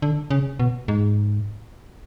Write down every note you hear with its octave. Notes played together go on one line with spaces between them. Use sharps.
D3
C#3
B2
G#2